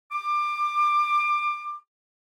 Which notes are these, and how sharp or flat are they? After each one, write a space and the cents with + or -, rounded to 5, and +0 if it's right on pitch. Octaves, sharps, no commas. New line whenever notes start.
D6 +25